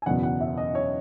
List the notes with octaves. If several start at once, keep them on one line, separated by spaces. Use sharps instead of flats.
G#5
F#1 E2 B2 F#5
F#5
E5
D#5
C#5